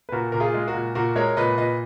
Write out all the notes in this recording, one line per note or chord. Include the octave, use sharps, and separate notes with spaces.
B4
A#2 F#4 A#4
A#2 A#4
F4 G#4
G#3
F#4 A#4
A#2
A#2 F#4 A#4
G#3 A#4 C#5
A#2 B4 D#5
A#2 B4 D#5